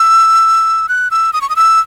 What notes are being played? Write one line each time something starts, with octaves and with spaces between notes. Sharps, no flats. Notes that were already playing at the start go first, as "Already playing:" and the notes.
Already playing: E6
F#6
E6
D#6
C#6
D#6
E6